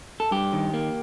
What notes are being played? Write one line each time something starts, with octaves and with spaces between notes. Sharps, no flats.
A4
G2 G4
D#3
A#3